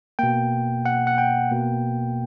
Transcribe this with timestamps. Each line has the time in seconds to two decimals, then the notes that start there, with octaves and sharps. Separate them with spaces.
0.19 B2 A#3 G5
0.86 F#5
1.07 F#5
1.18 G5
1.51 B2 A#3